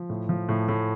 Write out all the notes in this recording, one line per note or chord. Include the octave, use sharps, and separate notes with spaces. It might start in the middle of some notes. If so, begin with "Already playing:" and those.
Already playing: F3
A2
F3
A2
A2